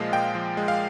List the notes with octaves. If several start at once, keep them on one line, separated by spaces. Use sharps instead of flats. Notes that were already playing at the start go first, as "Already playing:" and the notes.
Already playing: A#2 F3 G#3 D#5 F5
A#2 G5
F3
G#3
F5